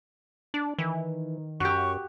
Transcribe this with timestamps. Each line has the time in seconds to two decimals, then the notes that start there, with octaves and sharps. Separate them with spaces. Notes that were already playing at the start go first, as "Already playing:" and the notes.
0.54 D4
0.78 D#3 E3
1.60 F#2 F#4 G4 C#6